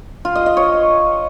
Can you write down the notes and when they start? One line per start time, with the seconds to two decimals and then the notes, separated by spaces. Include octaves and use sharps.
0.25 F4
0.35 D#5
0.46 D#5
0.57 C#5